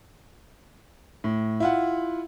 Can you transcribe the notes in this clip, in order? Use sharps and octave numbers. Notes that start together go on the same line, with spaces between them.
A2
E4 F4 F#5